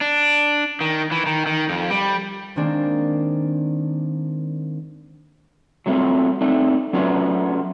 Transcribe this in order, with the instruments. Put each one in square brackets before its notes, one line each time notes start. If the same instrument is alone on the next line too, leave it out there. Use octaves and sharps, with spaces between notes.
[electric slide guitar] D4
D#3
E3
D#3
D#3
F2
G3
[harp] D#3 G#3 A#3 C4 D4
[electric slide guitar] F#3 G3 A3 C4 F4
A3 C4 D4 D#4
F#3 A3 C#4 D4 F4 B4